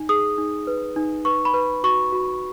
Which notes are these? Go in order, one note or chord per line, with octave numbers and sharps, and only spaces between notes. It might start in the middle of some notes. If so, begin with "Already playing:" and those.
Already playing: D#4
G#4 D#6
D#4
B4
D#4
B4 C#6
B5
B4
F#4 C#6
F#4